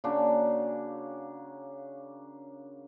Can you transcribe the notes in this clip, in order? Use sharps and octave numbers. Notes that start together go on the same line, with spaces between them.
C#3 A#3 D4 F#4